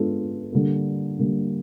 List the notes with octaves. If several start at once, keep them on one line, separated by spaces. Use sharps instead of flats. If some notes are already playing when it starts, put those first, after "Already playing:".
Already playing: G#3 B3 D4 F4 A4
D3 G3 A#3
D3 G3 A#3